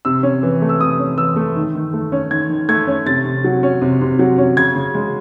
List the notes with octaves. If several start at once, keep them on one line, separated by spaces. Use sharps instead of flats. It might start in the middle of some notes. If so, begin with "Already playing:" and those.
C3 E6
C#4
E3
A3
E6
C3 D#6
C#4
E3 E6
A3
D#3
D#3
A3
C#4
D#3 G#6
D#3
A3 G#6
C#4
C3 A6
C3
F#3
C#4
C3
C3
F#3
C#4
C#3 G#6
C#3
G#3